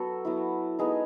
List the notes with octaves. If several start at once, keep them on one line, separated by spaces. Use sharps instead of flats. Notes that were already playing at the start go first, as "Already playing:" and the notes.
Already playing: F#3 B3 F#4 A4
F#3 B3 E4
G#3 B3 D#4 G#4